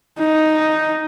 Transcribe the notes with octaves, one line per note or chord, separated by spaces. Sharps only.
D#4